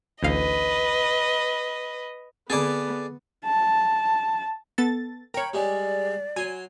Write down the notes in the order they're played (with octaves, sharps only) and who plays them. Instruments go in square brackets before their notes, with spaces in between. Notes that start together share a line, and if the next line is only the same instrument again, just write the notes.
[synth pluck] A1 D2 F5 [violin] B4 D#5
[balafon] D3 C4 [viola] B3 [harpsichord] G#4 A4 D5
[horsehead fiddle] A5
[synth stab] B3 A4 A6
[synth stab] A#4 C#5 [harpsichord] G5 B5
[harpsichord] G3 G#3 [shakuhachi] D5
[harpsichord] F#3 C6 [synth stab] G#5